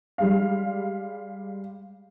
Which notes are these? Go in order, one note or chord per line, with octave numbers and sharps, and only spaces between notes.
G3 G#3 F5